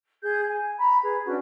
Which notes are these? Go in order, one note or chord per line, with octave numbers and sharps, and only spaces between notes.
G#4 G6
G#5
A#5 B5
G#4 B4
C#4 D4 F#4 B4